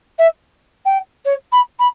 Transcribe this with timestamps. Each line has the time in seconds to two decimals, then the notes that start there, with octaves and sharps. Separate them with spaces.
0.18 E5
0.85 G5
1.25 C#5
1.52 B5
1.79 B5